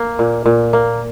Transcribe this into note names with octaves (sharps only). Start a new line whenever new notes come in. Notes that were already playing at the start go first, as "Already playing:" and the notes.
Already playing: A#3
A#2
A#2
A#3